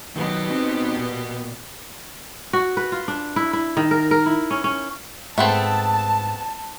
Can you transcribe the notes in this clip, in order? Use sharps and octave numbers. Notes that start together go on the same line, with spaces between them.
B2 D#3 F#3 B3 G4
C4 D#4
A#2
F#4
B4
F4
D4
E4
E4
D#3
A#4
A#4
E4
C#4
C#4
G#2 A3 B3 C4 A5